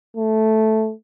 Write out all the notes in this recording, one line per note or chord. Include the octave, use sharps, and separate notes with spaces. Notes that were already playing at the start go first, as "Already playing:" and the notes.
A3